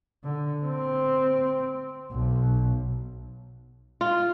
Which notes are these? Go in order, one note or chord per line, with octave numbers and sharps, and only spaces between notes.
D3
C4
B1
F4